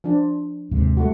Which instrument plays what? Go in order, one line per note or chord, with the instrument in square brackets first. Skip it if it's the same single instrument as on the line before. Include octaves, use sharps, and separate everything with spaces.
[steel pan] F3 D4
[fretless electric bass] D#2 G#2 C3
[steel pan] G3 A3 F#4